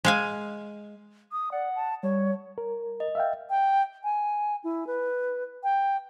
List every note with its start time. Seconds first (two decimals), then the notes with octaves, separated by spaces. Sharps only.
0.05 G#3 F5 G#5
1.32 D#6
1.52 D5 F#5
1.75 A5
2.03 G3 C#5
2.58 A#4
3.00 D#5
3.15 E5 F5 G5
3.50 G5
4.04 G#5
4.64 E4
4.87 B4
5.64 G5